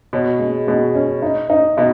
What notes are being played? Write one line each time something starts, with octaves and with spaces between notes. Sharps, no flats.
B2 C#5
G#3
B2 G#3
C#4
D#4
D#4
B2 D#4